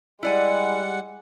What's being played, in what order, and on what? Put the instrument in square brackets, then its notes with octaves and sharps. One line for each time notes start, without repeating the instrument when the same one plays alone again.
[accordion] G3 F#5 [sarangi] G#3 [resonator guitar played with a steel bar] E4 D5 G#5